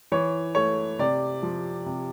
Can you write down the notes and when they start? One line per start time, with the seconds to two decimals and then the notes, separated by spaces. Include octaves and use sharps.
0.12 E3 C#5
0.55 A3 C#5
0.99 C3 D5
1.43 F3
1.86 C3